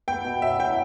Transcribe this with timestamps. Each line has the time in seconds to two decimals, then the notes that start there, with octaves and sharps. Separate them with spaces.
0.08 B3 G5
0.25 B2
0.42 F#3 E5
0.59 E4 G5